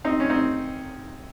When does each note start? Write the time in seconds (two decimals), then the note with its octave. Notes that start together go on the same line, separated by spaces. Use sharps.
0.05 C4 D#4
0.20 C#4
0.30 C4 D#4